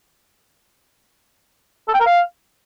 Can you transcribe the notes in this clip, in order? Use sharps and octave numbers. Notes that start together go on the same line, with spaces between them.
A4
G5
A#4
F5